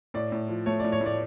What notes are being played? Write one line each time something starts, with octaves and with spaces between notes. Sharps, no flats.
A2 D5
A2
F3
A3 C#5
D5
A2
C#5
A2 D5